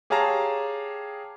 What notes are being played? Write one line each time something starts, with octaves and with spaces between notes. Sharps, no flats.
G4 G#4 C#5 F5 A5 A#5